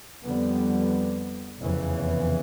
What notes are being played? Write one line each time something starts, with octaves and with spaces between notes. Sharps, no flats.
F2 D3 G3 B3
F1 E2 C#3 E3